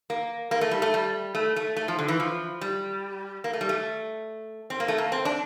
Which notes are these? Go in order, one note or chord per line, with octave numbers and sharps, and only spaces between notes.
A#3
A#3
A3
G3
A3
G3
A3
A3
A3
F3
D3
E3
F3
G3
A#3
A3
G3
A3
C4
A#3
A3
A#3
C4
D4